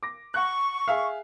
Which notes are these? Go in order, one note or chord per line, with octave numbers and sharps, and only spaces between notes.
D6 A#6
F#5 C#6 F#6
G#4 E5 F5